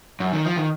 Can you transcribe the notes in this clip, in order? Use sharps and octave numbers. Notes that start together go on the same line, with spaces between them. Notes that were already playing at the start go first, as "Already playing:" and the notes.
F#2
D#3
F3
D#3